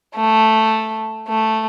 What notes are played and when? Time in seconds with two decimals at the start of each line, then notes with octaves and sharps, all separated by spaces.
0.16 A3
1.28 A3